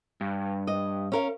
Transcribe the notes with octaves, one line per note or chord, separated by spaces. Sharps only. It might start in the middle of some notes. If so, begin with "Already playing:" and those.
G2
D#5
C#4 A#4 F5